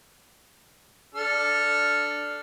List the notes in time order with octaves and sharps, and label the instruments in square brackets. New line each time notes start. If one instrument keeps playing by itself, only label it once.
[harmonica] D4 A4 F6